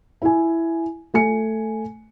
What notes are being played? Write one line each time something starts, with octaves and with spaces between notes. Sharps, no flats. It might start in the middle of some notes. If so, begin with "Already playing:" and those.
E4 G#5
A3 G#5 C#7